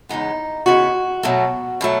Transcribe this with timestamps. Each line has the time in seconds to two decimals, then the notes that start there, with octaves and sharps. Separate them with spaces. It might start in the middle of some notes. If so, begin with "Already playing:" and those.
0.09 E2 C#3 G#3 B3 D#4
0.66 E2 C#3 G#3 B3 F#4
1.23 B2 F#3 A3
1.81 B2 F#3 A3